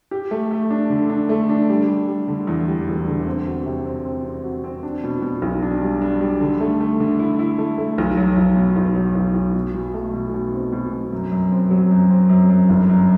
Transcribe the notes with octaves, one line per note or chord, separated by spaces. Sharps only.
G4
A3
A3
D4
D3
D4
A3
D4
G3
G3
G3
D3
E2
G3
E1
D3
C4
F#4
C3
C4
C4
C4
F#4
C4
D4
B2
B2
B1
D4
G3
D4
G3
D3
A3
A3
D3
E4
E4
A3
A3
B1
F#3
B1
B2
B1
F#3
B1
B1
B2
B2
A3
B2
B2
C4
B2
B2
F#2
F#2
C4
F#3
F#2
C4
F#2
F#2
G1
F#2